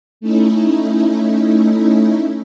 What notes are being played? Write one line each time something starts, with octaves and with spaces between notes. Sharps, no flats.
A3 C#4 D#4 E4